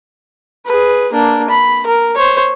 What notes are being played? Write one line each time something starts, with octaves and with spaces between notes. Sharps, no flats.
G#4 B4
A#3 D4
B5
A#4
C5 C#5